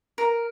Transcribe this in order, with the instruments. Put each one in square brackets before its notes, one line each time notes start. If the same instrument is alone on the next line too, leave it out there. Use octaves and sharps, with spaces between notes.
[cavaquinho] A#4